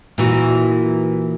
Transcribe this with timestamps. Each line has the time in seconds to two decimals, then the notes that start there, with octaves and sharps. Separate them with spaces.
0.18 A#2 E3 F#4